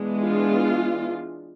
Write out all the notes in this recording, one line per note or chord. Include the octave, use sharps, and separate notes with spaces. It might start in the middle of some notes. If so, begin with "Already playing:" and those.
Already playing: E3 G#3 B3 D4
F4